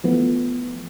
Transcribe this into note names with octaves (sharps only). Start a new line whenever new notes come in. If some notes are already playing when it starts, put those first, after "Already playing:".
E3 F3 A3 B3